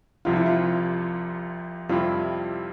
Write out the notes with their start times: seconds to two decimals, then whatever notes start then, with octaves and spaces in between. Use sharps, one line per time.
0.25 C2 C3 F3 F4
0.36 E4
0.46 F4
1.89 F2 C3 G3 C4 E4 F4